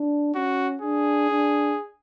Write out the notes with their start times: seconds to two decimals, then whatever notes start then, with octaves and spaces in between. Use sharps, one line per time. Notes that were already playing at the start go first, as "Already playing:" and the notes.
Already playing: D4
0.35 C#4 F#4
0.82 D4 G#4
1.30 D4